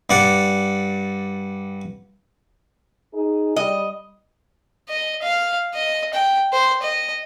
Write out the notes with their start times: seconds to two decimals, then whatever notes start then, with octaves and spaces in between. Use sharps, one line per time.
0.10 G2 D5 F#5
3.14 D#4 G#4
3.56 G3 D#5
4.89 D#5
5.23 F5
5.75 D#5
6.14 G5
6.53 C5
6.83 D#5